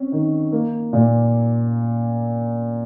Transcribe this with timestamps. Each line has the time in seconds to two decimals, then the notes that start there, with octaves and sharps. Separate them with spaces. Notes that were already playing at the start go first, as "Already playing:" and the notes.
Already playing: C4 C#4
0.12 D#3
0.52 A#3
0.93 A#2